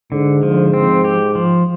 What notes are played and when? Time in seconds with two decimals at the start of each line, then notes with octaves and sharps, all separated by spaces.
0.12 G#2 D3
0.43 F3
0.73 C4
1.04 G4
1.35 F3